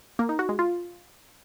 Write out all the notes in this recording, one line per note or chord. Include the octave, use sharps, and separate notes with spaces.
A#3
D#4
F#4
G#3
F4